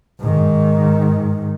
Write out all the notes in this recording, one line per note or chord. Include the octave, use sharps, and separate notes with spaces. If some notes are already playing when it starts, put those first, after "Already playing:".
G#2 D#3